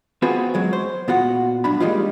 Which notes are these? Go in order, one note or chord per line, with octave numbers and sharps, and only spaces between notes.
B3 C4 F4 F#4 G#4 B4
F#2 F#3 G#3
C5
A#2 B3 F4 F#4 F#5
B1 G2 D4 B5
F3 G3 G#3 A#3 D#4 F4